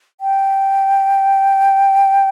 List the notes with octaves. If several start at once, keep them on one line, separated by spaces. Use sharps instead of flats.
G5